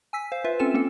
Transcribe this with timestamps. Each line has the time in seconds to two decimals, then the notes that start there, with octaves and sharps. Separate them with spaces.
0.13 G#5 E6 B6
0.32 C5 F5
0.44 F4 B4 E5
0.59 C4 C#4 F4 A4 G#5 E7
0.74 A#3 C4 C#4 A4